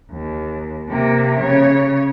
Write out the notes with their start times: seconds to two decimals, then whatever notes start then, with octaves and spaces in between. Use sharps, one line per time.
0.11 D#2
0.89 C3 A#3
1.40 C#3 C#5